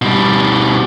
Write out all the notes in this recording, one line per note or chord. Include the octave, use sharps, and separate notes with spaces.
B2 G3